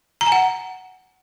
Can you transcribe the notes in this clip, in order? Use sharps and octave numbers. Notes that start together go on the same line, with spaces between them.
A#5
G#5
F#5